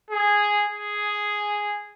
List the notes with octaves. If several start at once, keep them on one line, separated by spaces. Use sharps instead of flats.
G#4
G#4